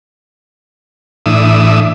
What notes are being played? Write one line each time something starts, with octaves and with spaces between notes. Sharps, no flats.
A2 E3 D4 E5 D#6